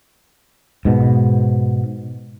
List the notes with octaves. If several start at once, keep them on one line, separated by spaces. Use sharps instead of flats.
G#2 B2